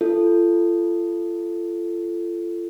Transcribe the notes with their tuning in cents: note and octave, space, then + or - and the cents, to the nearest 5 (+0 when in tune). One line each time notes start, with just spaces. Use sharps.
F4 -30 A4 +0